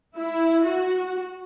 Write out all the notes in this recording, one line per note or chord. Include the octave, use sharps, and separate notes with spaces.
E4
F#4